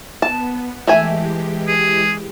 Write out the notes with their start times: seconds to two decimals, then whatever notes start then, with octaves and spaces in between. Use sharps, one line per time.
0.22 B3 A5
0.87 E3 G#3 A3 G4 E5 G#5
1.68 G#4